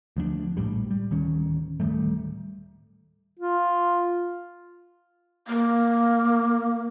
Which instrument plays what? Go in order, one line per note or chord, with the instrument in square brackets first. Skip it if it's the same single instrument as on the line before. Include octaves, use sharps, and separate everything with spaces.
[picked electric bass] D2 F3 B3 D4
A#1 A2 G3
G3
D1 D#3 C#4
D1 D#3 G3 A3
[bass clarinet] F4
[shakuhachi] A#3